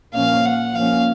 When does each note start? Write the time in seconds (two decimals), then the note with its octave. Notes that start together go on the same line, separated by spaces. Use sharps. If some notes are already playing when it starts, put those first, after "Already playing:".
0.14 A#2 F3 A#3 C#4 F5
0.46 F#5
0.75 F3 A#3 C#4 F5